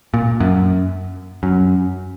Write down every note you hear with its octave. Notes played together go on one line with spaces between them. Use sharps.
A#2
F#2
F#2